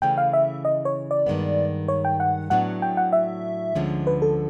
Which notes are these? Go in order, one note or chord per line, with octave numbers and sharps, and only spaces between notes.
C#3 E3 A3 C#4 G5
F5
E5
D#5
C#5
D5
G2 D#3 G#3 B3
C#5
G5
F#5
A2 F#3 B3 D4 F#5
G5
F#5
E5
D2 D3 F3 G#3 C#4
B4
A4